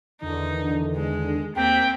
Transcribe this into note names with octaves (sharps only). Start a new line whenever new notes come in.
E2 D3 D#3 D#4
G#3
D#2 A#3 C4 G5 B6